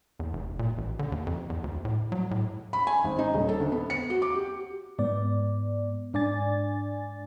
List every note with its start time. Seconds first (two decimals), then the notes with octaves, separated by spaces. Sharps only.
0.19 E2
0.33 F1
0.59 A#2
0.78 A1
0.99 D3
1.12 D#2
1.27 F2
1.50 E2
1.64 D2
1.85 A2
2.12 F#3
2.31 A2
2.73 B5
2.87 G#5
3.04 G#1
3.19 D#4
3.34 D#1
3.49 A4
3.60 D2
3.72 B3
3.90 C#7
4.10 F#4
4.22 D6
4.35 G4
4.99 G#2 B3 D5
6.14 G#2 D4 D5 G#5 A6